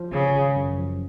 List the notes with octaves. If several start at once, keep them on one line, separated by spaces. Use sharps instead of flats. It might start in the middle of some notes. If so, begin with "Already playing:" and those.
Already playing: F3
G#1 C#3
G#1
F#2
F3